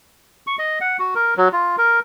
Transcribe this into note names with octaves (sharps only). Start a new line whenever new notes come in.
C#6
D#5
F#5
F#4
A#4
F#3
F4
A#4